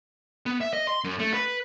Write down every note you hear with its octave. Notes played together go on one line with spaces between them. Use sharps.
B3
E5
D#5
C6
F#2
A3
B4